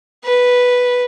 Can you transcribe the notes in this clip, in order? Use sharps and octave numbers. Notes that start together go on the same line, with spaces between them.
B4